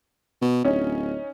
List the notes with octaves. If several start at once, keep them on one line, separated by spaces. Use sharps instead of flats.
B2
D1 C#4 D#4 C#5